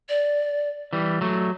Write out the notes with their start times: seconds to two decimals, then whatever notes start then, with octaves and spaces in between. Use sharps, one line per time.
0.09 D5
0.93 E3 G3
1.21 F#3 A3